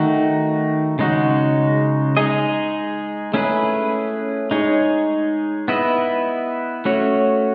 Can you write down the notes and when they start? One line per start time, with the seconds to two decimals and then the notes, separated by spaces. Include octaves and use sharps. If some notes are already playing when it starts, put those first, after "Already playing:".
Already playing: D#3 A3 D#4 F#4
0.99 C#3 G#3 D#4 F#4
2.17 G#3 D#4 G#4 D#5
3.34 A3 C#4 E4 G#4 B4
4.51 G#3 D#4 G#4 C#5
5.68 B3 E4 B4 D#5
6.85 A3 C#4 F#4 C#5